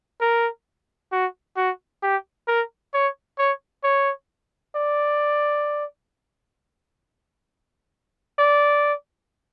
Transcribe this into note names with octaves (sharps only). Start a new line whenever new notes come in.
A#4
F#4
F#4
G4
A#4
C#5
C#5
C#5
D5
D5